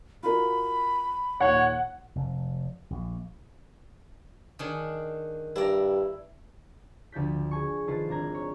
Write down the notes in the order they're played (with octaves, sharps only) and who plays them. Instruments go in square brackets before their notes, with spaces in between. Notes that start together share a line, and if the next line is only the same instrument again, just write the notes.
[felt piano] F4 F#4 A#4 [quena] B5
[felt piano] D#2 A#2 [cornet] C#5 [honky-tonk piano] F#5
[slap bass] F1
A#1
[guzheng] D#3 D4 G#4
[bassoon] G2 [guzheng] E4 D5 A#5
[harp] D2 F3 G6 B6
G#4 G#5 C#6
D#3 F4 A4 B4 C5
G#1 D4 A#5 G#6
C#5